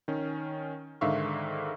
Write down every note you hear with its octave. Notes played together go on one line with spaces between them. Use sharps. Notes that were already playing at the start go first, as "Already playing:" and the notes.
D#3 C#4
G#2 D3 D#3 E5 F5 C#6